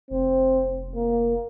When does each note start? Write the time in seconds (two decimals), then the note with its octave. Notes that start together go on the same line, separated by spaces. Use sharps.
0.10 F1 C4
0.96 A#3